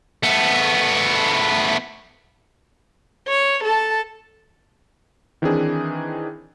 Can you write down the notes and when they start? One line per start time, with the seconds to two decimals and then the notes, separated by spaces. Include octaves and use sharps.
0.23 A3 B3
3.28 C#5
3.63 A4 A5
5.42 D#3 E3 C4 D4 D#4 G#4